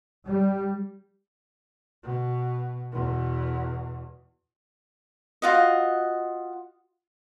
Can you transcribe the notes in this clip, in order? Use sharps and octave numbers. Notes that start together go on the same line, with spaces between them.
G3
B2
E2 B2
F4 F#4 D#5